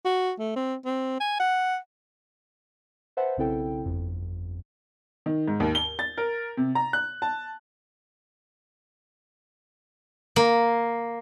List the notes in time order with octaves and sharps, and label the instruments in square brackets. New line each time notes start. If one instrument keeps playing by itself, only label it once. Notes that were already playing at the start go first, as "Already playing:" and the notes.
[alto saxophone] F#4
A3
C4
C4
G#5
F#5
[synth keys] B4 C5 E5 F#5 A5
B1 C#3 C4 E4 A4 G5
G1 F2
[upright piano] D#3
G#2
D#2
G7
A6
A#4
C3
A#5
F#6
A5
[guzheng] A#3